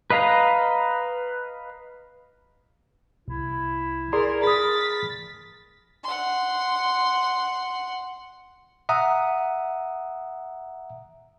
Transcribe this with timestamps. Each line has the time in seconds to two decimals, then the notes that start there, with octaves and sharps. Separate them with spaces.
0.10 B4 D#5 F5 A#5
3.28 C2 E4
4.13 G#4 A#4 D5 C6
4.44 G#4 A#4 B5 D#6 A6 B6
6.03 F#5 C6
8.89 E5 F#5 A#5 D#6